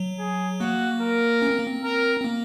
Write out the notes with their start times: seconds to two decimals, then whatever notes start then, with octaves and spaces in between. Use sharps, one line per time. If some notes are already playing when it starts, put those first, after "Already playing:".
Already playing: F#3
0.19 G#4
0.60 A#3 F#4
1.01 A#4
1.42 C#4
1.51 C4
1.59 A#3
1.67 C4
1.84 A#4
2.21 C4
2.24 A#3